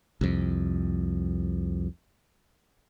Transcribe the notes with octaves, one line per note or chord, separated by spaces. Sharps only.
C2 F2